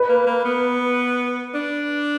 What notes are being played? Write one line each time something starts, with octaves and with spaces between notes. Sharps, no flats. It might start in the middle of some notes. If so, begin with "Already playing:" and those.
Already playing: B4
A#3
A#3
B3
D4